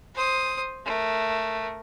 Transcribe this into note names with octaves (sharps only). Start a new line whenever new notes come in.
C5 D#6
A3 A#4